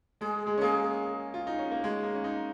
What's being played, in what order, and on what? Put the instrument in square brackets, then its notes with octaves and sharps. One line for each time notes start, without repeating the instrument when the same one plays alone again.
[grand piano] G#3 [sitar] G#4
[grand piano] G#3
C#4
[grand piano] A#3 [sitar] G#4
[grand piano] F4
D#4
C#4
A#3
G#3
A#3
C#4
D#4